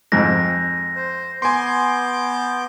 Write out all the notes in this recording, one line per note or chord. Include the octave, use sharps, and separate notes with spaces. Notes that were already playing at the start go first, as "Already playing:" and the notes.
F2 G#2 A#6
C5
B3 G#5 C6 D6 G6